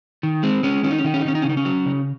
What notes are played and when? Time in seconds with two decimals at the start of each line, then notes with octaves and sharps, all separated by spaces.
0.23 D#3
0.43 G#3 C4
0.63 G#3 C#4
0.83 D#3 C#4
0.91 D#4
0.99 C#4
1.04 D#3 D#4
1.14 C#4
1.21 D#4
1.25 D#3 C#4
1.35 D#4
1.42 C#3 C#4
1.49 D#4
1.57 C#4
1.65 F#3
1.86 C#3